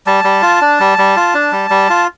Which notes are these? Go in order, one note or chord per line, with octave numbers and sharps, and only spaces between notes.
G3 A5
G3
F4
D4
G3
G3
F4
D4
G3
G3
F4